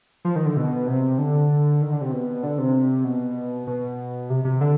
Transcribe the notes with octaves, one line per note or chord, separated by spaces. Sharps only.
F3
D#3
D3
B2
C3
D3
D#3
D3
C3
B2
D3
C3
B2
B2
C3
C3
D3